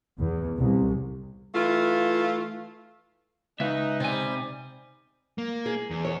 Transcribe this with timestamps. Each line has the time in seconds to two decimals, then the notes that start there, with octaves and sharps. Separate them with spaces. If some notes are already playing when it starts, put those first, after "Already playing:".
0.18 E2
0.59 C2
1.55 E3 A3 F4
3.60 C#2 D#4 B4 E5
4.00 C3 G3 C4 G#5
5.38 A#3
5.66 G#4
5.90 E2
6.05 C#5